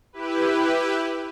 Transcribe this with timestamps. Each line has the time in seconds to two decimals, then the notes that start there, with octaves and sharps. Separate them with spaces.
0.13 E4 G4 B4